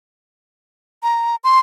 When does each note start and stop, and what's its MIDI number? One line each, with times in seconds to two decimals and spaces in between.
1.03 1.36 82
1.44 1.59 84